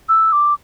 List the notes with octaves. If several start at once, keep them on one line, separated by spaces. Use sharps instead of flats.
E6
D6